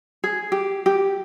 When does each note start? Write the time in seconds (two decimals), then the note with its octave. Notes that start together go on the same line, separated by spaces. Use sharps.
0.24 G#4
0.52 G4
0.86 G4